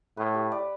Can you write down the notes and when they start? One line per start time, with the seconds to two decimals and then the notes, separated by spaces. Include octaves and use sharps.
0.17 A2 B4
0.34 G4
0.52 D5